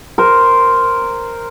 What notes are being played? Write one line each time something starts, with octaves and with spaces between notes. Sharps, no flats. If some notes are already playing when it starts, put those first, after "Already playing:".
A#4 C5